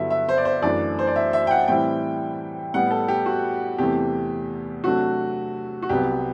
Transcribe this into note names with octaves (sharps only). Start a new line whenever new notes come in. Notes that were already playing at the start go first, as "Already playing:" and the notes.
Already playing: G2 D3 F#3 B3 E4 E5
E5
C5
D5
C5
F#2 E3 A3 D4 D5
C5
D5
E5
E5
G5
F#5
A2 E3 G3 C4 E4 G5
A2 G3 B3 F#5
A4
G4
F#4
E2 C3 E3 A3 G4
C3 F#3 A3 D4 F#4
F#4
C2 C3 F#3 B3 G4